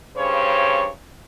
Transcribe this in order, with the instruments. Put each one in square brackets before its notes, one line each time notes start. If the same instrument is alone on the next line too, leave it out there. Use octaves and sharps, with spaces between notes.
[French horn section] G2 C#3 C5 C#5